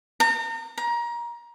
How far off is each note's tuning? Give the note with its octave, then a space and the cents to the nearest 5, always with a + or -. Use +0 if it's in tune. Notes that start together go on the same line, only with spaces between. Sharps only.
A#5 -35
A#5 +25